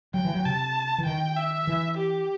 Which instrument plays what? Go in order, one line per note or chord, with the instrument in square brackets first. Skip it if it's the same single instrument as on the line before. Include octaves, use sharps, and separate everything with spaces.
[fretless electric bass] F#3 [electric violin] G5
[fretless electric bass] E3
F#3
[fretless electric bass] C3 [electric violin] A5
[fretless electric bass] E3
[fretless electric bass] D#3 [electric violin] G5
[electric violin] E5
[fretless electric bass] E3
[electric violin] G4